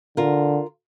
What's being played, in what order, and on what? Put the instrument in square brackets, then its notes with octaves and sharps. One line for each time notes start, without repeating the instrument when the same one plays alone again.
[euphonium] D3 [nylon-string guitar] F4 A#4